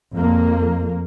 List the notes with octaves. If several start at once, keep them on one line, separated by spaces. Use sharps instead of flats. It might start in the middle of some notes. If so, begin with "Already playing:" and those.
F2 A#3